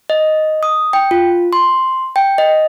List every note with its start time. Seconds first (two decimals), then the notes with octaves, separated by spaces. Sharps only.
0.10 D#5
0.63 D#6
0.93 G5
1.11 F4
1.53 C6
2.16 G5
2.38 D#5